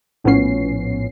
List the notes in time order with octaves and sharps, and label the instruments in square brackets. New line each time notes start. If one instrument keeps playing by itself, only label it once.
[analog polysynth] A#1 A2 F3 B3 C#4 C7